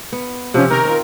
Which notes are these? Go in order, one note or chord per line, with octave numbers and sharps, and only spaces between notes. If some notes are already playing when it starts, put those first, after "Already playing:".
B3
C3 F3 C#4
D#3 C#4 A#4
C4 F4